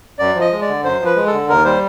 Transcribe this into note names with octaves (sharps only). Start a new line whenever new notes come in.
F#2 D5
F3
D#5
G#3
D5
D3
F#2 C5
F3
B4
G#3
A4
D3
D#2 A#4
G3 C5